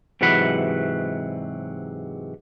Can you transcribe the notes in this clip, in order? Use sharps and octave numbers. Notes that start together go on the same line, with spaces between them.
G#2 C3 E3 F#3 F#5 B5